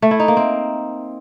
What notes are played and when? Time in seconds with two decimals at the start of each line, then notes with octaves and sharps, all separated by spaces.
0.02 A3
0.11 E4
0.20 D#4
0.28 A#3
0.37 C4